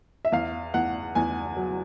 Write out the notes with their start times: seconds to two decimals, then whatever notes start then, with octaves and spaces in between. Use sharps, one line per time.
0.25 E5
0.32 E2 F5
0.74 E2 F#5
1.15 E2 G#5
1.57 F#3